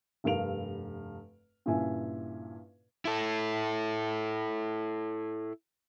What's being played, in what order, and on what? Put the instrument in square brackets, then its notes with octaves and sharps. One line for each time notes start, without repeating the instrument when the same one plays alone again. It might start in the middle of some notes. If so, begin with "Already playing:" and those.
[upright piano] F1 G2 A#4 F5 D7 F7
G2 A#2 C#3 E4 E5 G#5
[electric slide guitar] E4 A4